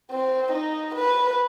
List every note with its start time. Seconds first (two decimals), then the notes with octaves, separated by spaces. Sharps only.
0.11 C4
0.52 D#4
0.94 B4